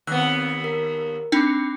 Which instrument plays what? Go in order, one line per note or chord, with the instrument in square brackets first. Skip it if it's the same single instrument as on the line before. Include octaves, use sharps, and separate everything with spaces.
[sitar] D#2 B3 [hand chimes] C4 F#6 [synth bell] E6
[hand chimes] A#4
[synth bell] C4 D4 D#4 [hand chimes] G5 B5 D6